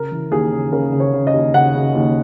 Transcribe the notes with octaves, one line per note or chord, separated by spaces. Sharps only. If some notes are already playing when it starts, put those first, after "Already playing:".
Already playing: C#3 A#4
E3
D#2 G#4
C#3
C#3 A#4
C#3
C#5
C#3
D#5
D#2
C#3 F#5
C#3
D#2